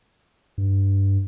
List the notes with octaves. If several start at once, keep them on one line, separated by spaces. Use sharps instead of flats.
G2